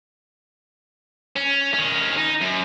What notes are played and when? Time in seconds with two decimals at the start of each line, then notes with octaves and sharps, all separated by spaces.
1.36 C#4
1.74 D#3 C#4
2.18 D#4
2.42 F#2